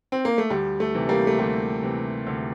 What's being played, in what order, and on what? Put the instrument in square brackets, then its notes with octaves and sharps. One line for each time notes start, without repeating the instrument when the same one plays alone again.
[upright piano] C4
A#3
A3
D2 G3
A3
C3 E3
G3 A#3
A3
D2 G3
C3 E3
D2